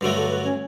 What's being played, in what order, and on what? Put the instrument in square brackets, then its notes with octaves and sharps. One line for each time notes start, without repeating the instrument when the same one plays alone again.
[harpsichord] G2 D3 F#3 A3 [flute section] F#4
[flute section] A4
B4
C#4 C#5